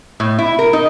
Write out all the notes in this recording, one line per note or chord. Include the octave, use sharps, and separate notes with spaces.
A2
E4
A#4
D#4